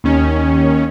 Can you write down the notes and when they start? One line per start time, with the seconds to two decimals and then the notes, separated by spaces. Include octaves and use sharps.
0.04 D#2 D#3 C#4